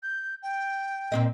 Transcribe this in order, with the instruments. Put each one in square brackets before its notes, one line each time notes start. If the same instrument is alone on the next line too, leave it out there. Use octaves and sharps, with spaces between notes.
[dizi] G6
G5
[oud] A#2 C4 D#5